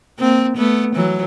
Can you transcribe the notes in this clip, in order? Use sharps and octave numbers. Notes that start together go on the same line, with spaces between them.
A#3 C4
A3 B3
E3 F#3